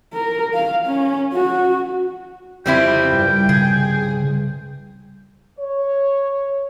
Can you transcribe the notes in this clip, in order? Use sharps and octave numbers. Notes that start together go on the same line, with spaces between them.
A#4
F5
C#4
F#4
F2 C#3 G3 C4 C#4 E4 G5
C2 G2
C#3 G#4
C#5